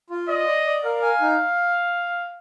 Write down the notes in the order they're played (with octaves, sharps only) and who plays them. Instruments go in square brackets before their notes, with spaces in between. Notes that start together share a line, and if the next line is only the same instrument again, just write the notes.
[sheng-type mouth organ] F4
[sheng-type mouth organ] D5 [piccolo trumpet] D#5
[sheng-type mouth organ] D5
D5
[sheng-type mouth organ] A#4 [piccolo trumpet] F5
[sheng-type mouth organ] G#5
D#4